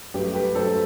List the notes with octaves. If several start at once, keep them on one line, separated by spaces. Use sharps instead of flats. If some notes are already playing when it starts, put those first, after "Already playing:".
G2 F#3 A3 G4 B4
G4 B4
G2 F#3 A3 A4 C5